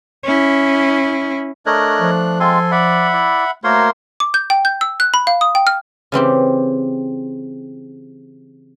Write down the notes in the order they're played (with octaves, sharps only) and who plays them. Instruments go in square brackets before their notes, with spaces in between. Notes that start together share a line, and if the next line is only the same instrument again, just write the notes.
[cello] C#4 E4
[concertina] A3 D4 F#6 [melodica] A#4 C#5 D#5
[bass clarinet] F3
[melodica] G#3 C4 F4 [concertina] A4 G#5 C6
[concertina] D5 [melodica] E5 F#5 B5
[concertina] E4 D5
[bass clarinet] A3 [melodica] A#3 A#4 C6 [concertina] F#4 C5 C#5
[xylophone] D6
G6
G5
G6
E6
F#6
B5
F5
D#6
G5
F6
[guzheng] C#3 E3 C4 G4